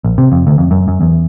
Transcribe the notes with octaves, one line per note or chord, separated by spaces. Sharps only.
A#1
C3
F2
D2
F2
F#2
F#2
E2